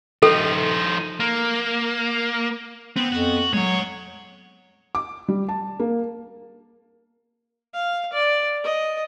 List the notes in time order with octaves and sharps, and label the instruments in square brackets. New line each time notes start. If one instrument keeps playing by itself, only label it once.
[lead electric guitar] F3 D#4 [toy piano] A4
[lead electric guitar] A#3
[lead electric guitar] B3 [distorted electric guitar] C4
[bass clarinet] F2 [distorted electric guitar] F#4
[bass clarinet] F#3 [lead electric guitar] G#3 F#5 [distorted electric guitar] C#5
[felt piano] D6
G3
A5
A#3
[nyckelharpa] F5
D5
D#5